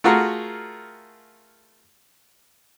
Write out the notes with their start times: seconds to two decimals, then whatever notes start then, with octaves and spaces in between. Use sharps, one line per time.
0.04 A3 F4 F#4 G#4 A#4